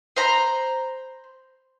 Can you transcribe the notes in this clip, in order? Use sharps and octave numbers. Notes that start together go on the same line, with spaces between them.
C5 A#5 B5